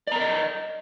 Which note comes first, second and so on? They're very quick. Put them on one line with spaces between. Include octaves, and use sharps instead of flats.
D5 A#5 A#4 D#5